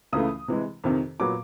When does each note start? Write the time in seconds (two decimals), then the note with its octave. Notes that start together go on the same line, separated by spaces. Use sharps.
0.12 C#2 C#3 E3 A3 D#6
0.48 C3 E3 G#3
0.84 F2 C3 D#3
1.20 A#2 F#3 B3 D6